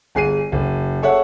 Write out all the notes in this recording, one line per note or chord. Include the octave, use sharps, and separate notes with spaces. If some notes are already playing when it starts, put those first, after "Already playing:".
G1 G#4 C7 D#7
F#1
G#4 A4 C#5 E5 F#5